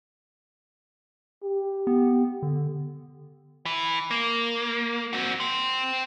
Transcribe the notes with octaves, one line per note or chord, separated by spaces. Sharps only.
G4
B3
D3
E3
A#3
C4 F#4
G5 C6